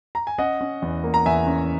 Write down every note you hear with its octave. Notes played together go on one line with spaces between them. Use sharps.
A#5
G#5
C#4 D#5 F#5
C#4
E2
A#3
A#5
E2 E5 G#5
C#4